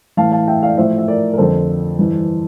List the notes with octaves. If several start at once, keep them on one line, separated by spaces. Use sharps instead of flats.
A2 E3 F5 A5
F5 A5
E5 G5
D5 F5
A2 F3 C5 E5
E5
A#4 D5
A#4
F2 D3 F3 A4 C5
G2 E3